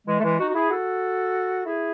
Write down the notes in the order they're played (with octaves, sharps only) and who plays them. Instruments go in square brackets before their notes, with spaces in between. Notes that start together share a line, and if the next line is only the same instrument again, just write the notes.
[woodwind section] E3 G#3
A3
E3 G#3
D#4 F#4
F#4
E4 G#4
F#4 A4
E4 G#4